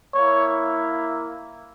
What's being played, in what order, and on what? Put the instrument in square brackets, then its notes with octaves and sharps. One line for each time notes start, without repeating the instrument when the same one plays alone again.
[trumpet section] A#3 E4 C#5